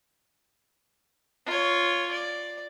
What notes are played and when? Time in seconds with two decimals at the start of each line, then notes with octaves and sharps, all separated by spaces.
1.46 F4 C#5
2.11 D5